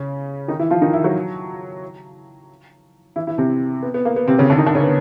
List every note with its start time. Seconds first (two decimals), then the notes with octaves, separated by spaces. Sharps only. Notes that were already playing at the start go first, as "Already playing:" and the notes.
Already playing: C#3 C#4
0.48 D#3 D#4
0.59 E3 E4
0.70 F3 F4
0.82 D#3 D#4
0.93 E3 E4
1.04 F#3 F#4
3.16 E3 E4
3.27 E3 E4
3.38 C3 C4
3.82 B3
3.94 B3
4.05 A#3
4.16 B3
4.28 C3 C4
4.39 C#3 C#4
4.50 D3 D4
4.58 D#3 D#4
4.66 D3 D4
4.75 C#3 C#4
4.83 B3